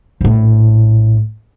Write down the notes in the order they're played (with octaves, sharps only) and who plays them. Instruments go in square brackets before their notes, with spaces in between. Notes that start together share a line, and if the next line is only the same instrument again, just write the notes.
[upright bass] A#1 A2